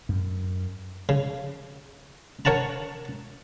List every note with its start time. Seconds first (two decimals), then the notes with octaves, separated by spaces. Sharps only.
0.09 F#2
1.09 C#3
2.45 A#4 C#5 F#5 A5 A#5